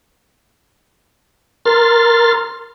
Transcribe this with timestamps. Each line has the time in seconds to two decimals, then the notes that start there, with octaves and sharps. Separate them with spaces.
1.65 A#4 C6 F6 A6